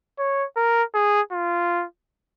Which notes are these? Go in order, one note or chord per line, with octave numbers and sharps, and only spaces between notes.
C#5
A#4
G#4
F4